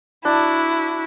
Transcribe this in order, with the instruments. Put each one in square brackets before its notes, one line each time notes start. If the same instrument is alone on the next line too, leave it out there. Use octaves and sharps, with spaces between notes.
[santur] D4 [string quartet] E4 F#4